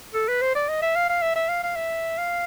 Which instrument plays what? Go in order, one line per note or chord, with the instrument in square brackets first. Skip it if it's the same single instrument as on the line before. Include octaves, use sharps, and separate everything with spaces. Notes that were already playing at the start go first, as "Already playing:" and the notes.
[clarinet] A4
B4
C5
D5
D#5
E5
F5
F5
E5
E5
F5
F5
E5
F5